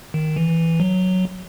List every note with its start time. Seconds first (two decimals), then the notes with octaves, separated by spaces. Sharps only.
0.14 D#3
0.36 E3
0.80 F#3